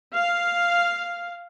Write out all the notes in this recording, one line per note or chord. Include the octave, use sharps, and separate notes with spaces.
F5